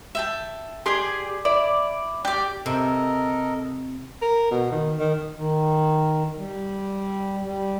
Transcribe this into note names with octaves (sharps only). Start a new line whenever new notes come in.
E5 G5 A5
G4 G#4 D5 C6
E4 D5
G4 D5 D6
C3 A4 A#4 D#5
A#4
B2
D#3
D#3
D#3
G3
G3